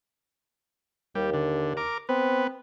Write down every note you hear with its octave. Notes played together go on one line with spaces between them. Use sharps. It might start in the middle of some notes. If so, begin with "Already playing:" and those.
D#2 G3
D3
A#4 D6
B3 C4